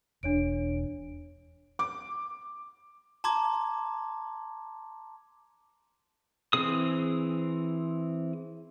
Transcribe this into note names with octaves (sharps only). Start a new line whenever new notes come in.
E1 D4 C#5 D7
D6
A5 A#5 C6 D6 G#6
E3 C4 G#4 D#6